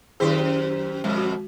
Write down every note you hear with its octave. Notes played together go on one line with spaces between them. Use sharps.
F#2 D#3 E4 G4 G#4 C5
F2 B2 G#3
F#4